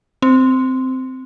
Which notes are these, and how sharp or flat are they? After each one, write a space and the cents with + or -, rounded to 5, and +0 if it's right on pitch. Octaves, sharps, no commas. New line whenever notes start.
C4 -10